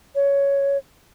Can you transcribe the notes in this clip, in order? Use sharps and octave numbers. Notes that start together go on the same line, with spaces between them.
C#5